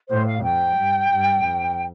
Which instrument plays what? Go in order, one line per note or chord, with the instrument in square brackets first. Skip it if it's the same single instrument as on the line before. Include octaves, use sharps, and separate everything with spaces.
[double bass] A2 [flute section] C5
[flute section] F5
[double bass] F2 [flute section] G5
[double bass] G2
G2
F2